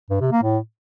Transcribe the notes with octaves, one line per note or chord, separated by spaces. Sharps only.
G2
C3
A#3
A2